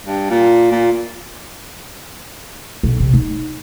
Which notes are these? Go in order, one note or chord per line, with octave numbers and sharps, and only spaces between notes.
G2
A#2
A#2
B1
C3
D#4